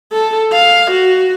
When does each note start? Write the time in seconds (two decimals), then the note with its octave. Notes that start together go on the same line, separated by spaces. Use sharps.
0.12 A4
0.53 F5
0.91 F#4